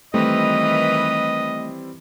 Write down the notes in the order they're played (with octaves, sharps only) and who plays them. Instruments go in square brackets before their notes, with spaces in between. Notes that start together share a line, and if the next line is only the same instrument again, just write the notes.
[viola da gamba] D#3 E3 B4 [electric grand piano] G3 C4 E4 [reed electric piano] A3 [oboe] D#5